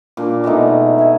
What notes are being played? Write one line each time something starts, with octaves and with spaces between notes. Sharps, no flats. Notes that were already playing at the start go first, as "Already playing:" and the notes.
A#2 D4
B2 G#3 A3 D#4
E5 G#5